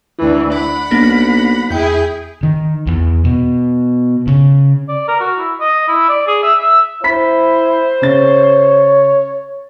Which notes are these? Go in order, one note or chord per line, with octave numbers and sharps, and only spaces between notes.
D2 E3 E4
D5 F#5 B5
B1 A#3 D4 A#6
E2 E4 G#4 G5 G6
D#3
E2
B2
C#3
D5
A#4
F#4
E4
D#5
E4
D5
G#4
E5
E5
E4 C5 B5 B6
C#3 C#5 A6